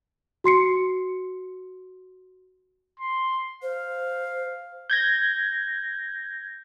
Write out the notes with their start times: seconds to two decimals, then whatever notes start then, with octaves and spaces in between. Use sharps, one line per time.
0.44 F#4 C6 C7 C#7
2.99 C6
3.63 C5 F5
4.90 G6 G#6 A#6